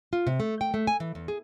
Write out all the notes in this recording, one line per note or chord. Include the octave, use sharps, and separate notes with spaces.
F4
C3
A3
G5
A3
G#5
E3
E2
G#4